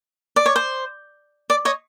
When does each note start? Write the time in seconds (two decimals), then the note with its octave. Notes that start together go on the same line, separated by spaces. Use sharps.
0.36 D5
0.46 C#5
0.56 C5
1.50 D5
1.65 C#5 D#5